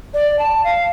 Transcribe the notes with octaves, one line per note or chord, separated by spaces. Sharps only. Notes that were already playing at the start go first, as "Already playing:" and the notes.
D5
A5
F5